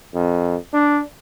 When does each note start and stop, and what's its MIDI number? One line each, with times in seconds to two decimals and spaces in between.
0.15 0.56 41
0.74 1.01 62